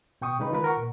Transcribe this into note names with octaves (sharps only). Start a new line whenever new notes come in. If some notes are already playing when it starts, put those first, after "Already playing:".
B2 G5 C#6 D#6
C#3 G#3 D#4 B4
D#3 F4 A#4 B4
A#4 F#5 C#6
A#2